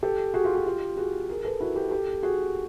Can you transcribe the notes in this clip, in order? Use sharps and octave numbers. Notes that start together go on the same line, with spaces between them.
G4 A4
F#4 G#4
F4 G4
F4 G4
F4 G4
F#4 G#4
G#4 A#4
A4 B4
E4 F#4
G4 A4
G4 A4
F#4 G#4